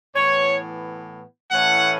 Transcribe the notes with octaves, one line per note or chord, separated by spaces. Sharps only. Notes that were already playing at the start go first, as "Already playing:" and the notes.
A2 E3 B3 C#5
A2 E3 A3 C#4 F#5